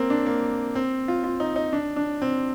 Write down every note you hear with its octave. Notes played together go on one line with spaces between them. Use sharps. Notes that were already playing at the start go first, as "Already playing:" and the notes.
Already playing: A#3 C4
D4
A#3
C4
F4
F4
D#4
D#4
D4
D4
C4